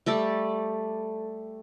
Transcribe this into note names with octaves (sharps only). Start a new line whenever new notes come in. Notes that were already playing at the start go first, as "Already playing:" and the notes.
G3 A3 A4 D5